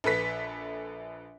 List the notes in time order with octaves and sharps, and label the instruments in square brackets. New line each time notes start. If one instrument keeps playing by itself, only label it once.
[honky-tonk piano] A#1 A4 B4 B6